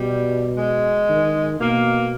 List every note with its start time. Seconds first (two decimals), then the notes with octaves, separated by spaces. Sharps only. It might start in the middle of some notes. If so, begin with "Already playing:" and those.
Already playing: B2 G3
0.57 G#3
1.09 D#3
1.60 B2 A#3